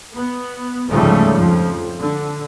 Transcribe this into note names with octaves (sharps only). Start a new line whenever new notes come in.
B3
D2 G#2 C#3 F3 G3 A3
F2 F3
D3